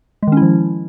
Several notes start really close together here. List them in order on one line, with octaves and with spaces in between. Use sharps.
G#3 D#3 C#4 E4 F3